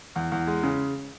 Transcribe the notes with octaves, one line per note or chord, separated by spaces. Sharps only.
E2
E2
G#3
C#3